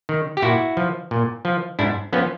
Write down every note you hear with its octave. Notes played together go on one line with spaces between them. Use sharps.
D#3
G4
A#2 E4 F#4
F3
A#2
F3
G#2 D4 E4
F3 B3 C#4